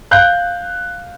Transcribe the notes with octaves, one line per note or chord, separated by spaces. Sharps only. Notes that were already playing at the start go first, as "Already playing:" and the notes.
F5 F#6 G6